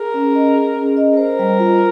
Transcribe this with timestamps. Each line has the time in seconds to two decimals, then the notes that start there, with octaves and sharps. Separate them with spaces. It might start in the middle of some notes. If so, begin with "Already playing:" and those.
Already playing: G#4 A#4
0.14 C#4
0.35 D#5
0.55 G#4
0.76 C#4
0.97 D#5
1.17 A#4 C5
1.39 G3
1.59 F4